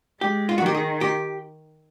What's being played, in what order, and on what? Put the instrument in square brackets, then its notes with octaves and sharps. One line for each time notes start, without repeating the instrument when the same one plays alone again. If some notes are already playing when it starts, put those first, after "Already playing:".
[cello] G#3 [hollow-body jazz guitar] G4
[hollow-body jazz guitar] F4
F#4
[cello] D#3 [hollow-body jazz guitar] G4
[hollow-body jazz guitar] G#4
G4